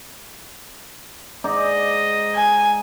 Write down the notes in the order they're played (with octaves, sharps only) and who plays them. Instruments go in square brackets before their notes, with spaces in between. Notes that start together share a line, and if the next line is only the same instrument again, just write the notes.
[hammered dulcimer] G#2 D#4 D5 [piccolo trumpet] D#5
[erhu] G#5